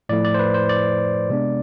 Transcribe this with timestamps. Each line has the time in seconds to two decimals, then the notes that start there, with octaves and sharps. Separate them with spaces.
0.09 A2 F3 A3 E4 D5
0.25 D5
0.34 C5
0.39 B4
0.54 C5
0.69 D5
1.29 C3 G#3 B3 D4